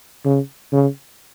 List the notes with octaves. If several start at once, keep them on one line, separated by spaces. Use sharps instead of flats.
C#3
C#3